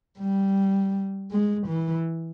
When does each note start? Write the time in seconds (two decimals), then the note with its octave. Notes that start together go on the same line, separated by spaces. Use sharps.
0.19 G3
1.31 G#3
1.67 E3